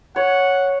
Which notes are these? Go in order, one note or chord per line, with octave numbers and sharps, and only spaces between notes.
C#5 F#5